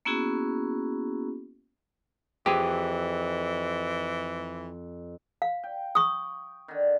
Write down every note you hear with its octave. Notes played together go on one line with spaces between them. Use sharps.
A#3 B3 C#4 E4 F#4 G#4
F2 E3 G4 G#4 G#5
F5
G5
C#6 D#6
D3 D#3